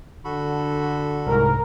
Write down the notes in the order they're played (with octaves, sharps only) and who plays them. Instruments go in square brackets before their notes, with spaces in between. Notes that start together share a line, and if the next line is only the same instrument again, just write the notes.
[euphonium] D3 [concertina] F#4 A4 B5
[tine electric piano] C2 G#2 [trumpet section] A#4